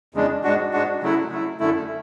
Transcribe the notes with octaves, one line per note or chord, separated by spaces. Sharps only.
E2 C#3 G#3 D4
G#2 G#3 D4 F#4
G#2 G#3 D4 F#4
C#3 F#3 A3 E4
C#3 F#3 A3 E4
F#2 D3 A3 E4